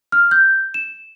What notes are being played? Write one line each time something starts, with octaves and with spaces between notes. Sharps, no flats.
F6
G6
E7